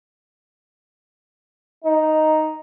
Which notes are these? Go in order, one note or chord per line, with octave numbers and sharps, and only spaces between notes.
D#4